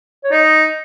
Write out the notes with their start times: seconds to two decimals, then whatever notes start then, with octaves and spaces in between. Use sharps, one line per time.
0.24 C#5
0.32 D#4 D#5